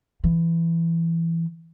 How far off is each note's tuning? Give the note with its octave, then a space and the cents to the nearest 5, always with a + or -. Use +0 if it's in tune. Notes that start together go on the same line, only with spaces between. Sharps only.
E3 +15